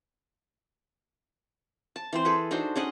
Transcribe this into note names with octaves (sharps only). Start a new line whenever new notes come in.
A5
E3 C4 C5
G#4 A4 B4
D4 D#4 F#4 C5
C#4 G#4 D#5 F#5